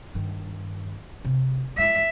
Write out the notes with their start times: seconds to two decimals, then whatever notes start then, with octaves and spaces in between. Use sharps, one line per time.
0.14 G2 D#3
1.25 C3
1.78 G#3 E4 E5